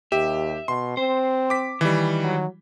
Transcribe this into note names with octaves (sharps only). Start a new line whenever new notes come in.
D#2 G4 E5
B2 C6
C4 C5
D6 B6
D#3 E3 G3
F#3